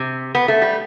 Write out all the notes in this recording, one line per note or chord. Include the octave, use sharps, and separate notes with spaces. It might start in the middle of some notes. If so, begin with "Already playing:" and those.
Already playing: C3
B3
A3
G3